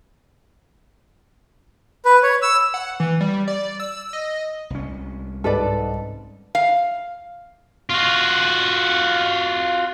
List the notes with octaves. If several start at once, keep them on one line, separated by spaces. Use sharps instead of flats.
B4
C#5
E6
F#5
E3
G3
D5
E6
D#5
C2 C#4
G#2 A4 B4 D5
F5
F4 F#4